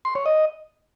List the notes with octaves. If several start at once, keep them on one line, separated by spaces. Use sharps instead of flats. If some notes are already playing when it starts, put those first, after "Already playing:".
C6
C#5
D#5